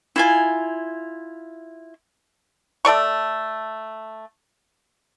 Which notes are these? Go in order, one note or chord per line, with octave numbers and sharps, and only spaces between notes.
E4 F4 G#5
A3 A4 D5 C#6